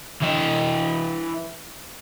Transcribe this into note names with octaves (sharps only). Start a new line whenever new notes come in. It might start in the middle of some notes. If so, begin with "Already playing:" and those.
E3 D#5